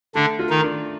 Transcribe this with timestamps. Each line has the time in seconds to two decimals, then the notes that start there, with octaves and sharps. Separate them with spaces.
0.15 D3 A3 D4
0.39 F4
0.50 D#3 D#4
0.62 D4